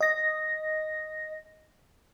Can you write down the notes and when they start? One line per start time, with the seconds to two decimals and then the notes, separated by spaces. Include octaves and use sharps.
0.01 D#5 A#6